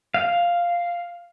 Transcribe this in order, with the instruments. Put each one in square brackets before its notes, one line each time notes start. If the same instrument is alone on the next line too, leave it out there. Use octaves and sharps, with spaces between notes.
[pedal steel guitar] F5